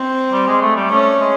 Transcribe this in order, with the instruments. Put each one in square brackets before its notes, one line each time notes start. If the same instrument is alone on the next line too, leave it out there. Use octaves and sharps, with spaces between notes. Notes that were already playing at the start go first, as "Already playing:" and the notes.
Already playing: [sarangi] C4
[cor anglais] G3
G#3
A3
G3
[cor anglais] A3 [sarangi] C#4
[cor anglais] G#3